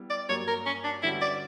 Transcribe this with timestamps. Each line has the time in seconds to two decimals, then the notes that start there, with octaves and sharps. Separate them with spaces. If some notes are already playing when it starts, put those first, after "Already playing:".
Already playing: G3 B3 E4
0.10 D5
0.29 G2 F#3 A#3 C#5
0.48 A#4
0.66 C#4
0.84 D4
1.03 D3 G3 C#4 E4 F#4 B4
1.21 D5